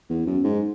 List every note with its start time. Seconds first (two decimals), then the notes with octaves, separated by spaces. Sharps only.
0.10 E2
0.26 F#2
0.44 G#2